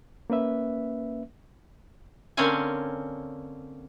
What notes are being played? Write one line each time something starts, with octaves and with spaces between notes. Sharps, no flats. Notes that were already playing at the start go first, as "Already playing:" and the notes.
A#3 C#4 B4 E5
D3 A#3 C4 C#4 C#5 G#5